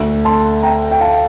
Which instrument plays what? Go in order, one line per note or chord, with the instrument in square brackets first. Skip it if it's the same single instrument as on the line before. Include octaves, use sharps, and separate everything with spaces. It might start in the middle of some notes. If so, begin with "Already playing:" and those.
Already playing: [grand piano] D2 D3 A3
[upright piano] A5 C6
G5 A#5
G5
F5 A5